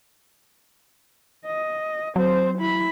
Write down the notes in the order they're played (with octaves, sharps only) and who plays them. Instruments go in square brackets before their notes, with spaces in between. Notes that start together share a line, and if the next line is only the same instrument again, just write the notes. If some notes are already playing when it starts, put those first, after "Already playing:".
[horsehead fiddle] D#5
[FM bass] F#3 [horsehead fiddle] C4 C5
[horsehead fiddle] E4 B5